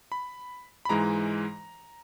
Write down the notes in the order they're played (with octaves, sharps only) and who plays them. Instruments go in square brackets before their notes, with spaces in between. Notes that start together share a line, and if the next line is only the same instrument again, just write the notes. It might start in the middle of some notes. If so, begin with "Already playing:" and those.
[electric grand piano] B5
B5
G#2 E3 G#3 A#5